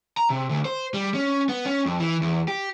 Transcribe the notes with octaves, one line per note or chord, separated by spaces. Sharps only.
A#5
C3
D2
C5
G3
C#4
B3
C#4
F2
E3
E2
G4